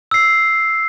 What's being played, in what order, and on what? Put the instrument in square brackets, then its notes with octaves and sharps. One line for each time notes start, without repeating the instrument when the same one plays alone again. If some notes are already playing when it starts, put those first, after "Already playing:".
[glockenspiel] E6 C7